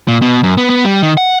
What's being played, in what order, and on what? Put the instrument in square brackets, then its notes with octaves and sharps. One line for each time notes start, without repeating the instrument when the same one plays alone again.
[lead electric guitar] A#2
B2
F#2
B3
B3
G3
D#3
F#5